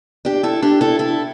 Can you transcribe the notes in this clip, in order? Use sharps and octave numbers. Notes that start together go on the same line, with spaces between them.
D4 G4
E4 A4
D4 G4
E4 A4
E4 A4